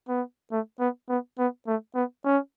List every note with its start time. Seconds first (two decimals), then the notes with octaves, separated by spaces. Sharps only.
0.08 B3
0.52 A3
0.80 B3
1.09 B3
1.39 B3
1.67 A3
1.95 B3
2.25 C#4